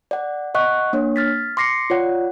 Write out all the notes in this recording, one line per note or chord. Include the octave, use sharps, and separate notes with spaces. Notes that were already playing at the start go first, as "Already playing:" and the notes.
D5 F#5
D#5 F#5 C#6 F#6
A#3 D4 C#5
F6 A6 B6
C6 D6 A#6 C7 C#7
F4 C#5 D5 F#5